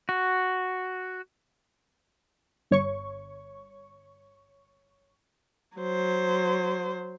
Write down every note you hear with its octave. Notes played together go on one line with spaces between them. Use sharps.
F#4
G1 C#5 C#6
F#3 C5